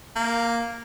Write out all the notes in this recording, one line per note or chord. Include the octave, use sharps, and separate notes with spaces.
A#3